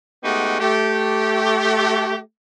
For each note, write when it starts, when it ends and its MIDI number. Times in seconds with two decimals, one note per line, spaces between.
0.23 0.58 56
0.23 0.58 57
0.23 0.58 59
0.23 0.58 63
0.23 0.58 66
0.23 0.58 67
0.60 2.19 57
0.60 2.19 67